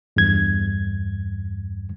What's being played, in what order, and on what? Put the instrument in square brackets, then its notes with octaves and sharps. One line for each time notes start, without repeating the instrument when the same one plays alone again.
[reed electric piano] E2 G2 G#6